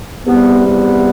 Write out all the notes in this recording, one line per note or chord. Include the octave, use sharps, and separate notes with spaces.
E2 C3 G3 B3
B3